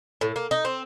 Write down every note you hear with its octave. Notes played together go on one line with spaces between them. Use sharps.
A2
A#3
D#4
C4